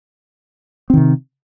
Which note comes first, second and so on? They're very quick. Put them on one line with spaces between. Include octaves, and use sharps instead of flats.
C4 D#3 C3